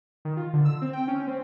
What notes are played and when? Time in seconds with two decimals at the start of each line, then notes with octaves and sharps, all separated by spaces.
0.25 D#3
0.37 F4
0.53 D3
0.65 E6
0.82 C4
0.93 G5
1.08 C#4
1.27 C4